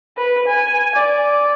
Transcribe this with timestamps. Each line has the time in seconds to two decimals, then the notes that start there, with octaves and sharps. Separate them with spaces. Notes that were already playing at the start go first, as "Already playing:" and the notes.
0.17 B4
0.47 G#5
0.95 D5